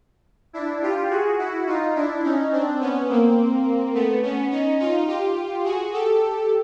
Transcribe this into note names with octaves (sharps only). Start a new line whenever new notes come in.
D4 E4
F4 G4
F#4 G#4
E4 F#4
D#4 F4
D4 E4
C#4 D#4
C4 D4
B3 C#4
A#3 C4
A3 B3
B3 C#4
C#4 D#4
D#4 F4
F4 G4
F#4 G#4
G4 A4